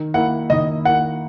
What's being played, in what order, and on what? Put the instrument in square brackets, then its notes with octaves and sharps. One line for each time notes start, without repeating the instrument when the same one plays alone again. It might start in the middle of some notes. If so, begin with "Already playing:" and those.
Already playing: [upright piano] D#3
[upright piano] A#3 E4 A#4 [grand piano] F#5
[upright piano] D#3 [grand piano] D#5
[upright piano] A#3 E4 A#4 [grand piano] F#5